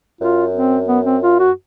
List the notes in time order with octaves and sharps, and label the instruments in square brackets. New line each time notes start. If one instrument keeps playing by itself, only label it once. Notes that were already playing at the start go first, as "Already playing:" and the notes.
[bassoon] F#2 [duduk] F4
[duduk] C4
B3
C4
F4
F#4